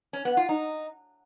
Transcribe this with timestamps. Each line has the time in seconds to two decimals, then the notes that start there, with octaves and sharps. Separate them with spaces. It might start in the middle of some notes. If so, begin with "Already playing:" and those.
0.13 C#4
0.25 B3
0.37 F4
0.49 D#4